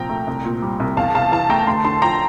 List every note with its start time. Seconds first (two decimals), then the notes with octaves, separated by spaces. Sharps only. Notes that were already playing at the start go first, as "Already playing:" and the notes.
Already playing: C2 A#2 F3 G5 A#5
0.09 A3
0.27 C2
0.45 A#2
0.62 G3
0.80 C2
0.97 E2 F5 A5
1.15 C3 F5 A5
1.32 E3 F5 A5
1.49 A3 G5 A#5
1.67 D2 A5 C6
1.85 D3 A5 C6
2.02 F3 G5 A#5